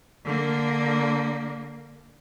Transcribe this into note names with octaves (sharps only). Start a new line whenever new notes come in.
D3 A#3